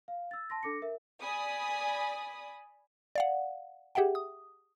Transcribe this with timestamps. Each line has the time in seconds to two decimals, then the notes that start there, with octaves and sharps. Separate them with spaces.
0.08 F5
0.31 E6 A6
0.50 A5 C6 A#6
0.63 D4 A4 D6 A#6 C#7
0.82 A#4 E5
1.20 D5 G#5 B5 D#6
3.15 D5 F5 F#5
3.95 G4 G#4 E5 F#5 G5
4.15 D#6